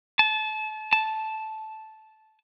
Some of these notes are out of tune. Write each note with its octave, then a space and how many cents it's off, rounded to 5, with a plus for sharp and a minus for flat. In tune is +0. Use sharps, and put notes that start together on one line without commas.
A5 -30
A5 -10